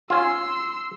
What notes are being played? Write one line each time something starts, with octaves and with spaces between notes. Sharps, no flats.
C#4 F4 C6 E6